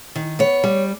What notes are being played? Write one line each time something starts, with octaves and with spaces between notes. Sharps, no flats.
D#3
B3 C#5
G3